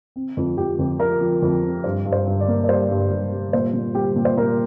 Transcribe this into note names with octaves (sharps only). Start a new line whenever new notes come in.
C4
F2
F2 G4
F2
F3 A#4
F3
F2
C4
G2 C5
G2
C5
G2
D5
A#3
D5
G3 C5
G2
G2
G3
A#2 C5
A#2
G3 G4
A#2
C5
A#2 A#4